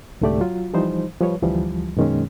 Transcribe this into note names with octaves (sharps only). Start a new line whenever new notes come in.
C2 G#2 D3 A3 G4 D5
F#3 F4
E3 F3 G3 D#4 C5
F3 G3 B4 C#5
D2 E3 F3 G3
F#2 B2 D#3 G#3 C#4